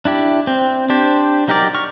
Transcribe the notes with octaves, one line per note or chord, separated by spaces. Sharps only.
D4 E4 G4
C4
D4 G4 C5
F#3 D#4 G4 A#4 D5
C#6 F6